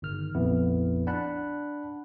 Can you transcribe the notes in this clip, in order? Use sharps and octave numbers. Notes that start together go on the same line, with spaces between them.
G1 D#3 F6
A#1 F2 B3 E4
D4 F#5 A5 B5 F#6